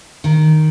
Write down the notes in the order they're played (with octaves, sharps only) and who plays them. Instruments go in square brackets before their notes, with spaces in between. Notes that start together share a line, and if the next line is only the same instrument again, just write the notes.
[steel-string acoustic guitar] D#3